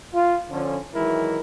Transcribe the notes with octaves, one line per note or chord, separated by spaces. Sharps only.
F4
D3 F3 C#4
D#3 E3 F#3 G#3 E4 A#4